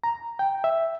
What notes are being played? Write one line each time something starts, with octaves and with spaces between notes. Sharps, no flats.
A#5
G5
E5